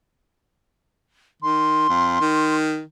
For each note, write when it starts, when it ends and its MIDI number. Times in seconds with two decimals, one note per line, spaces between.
1.42 1.85 51
1.42 2.55 84
1.89 2.17 41
2.21 2.82 51